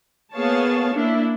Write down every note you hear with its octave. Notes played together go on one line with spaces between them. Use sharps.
A#3 B3 G#4 C#5 F5 A5
A#3 D4 E4